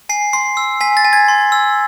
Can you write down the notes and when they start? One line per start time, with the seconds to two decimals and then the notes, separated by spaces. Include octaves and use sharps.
0.09 G#5 C7
0.33 C6 C7
0.57 E6
0.81 G#5 B6
0.97 A6
1.05 G#5
1.13 G#6
1.28 C6
1.52 E6